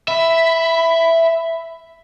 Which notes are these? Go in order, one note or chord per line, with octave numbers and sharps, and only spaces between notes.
E5 B5